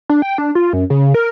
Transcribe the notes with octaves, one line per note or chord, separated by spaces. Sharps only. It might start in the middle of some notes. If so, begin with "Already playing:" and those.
D4
G5
D4
F4
F#2
C#3
A#4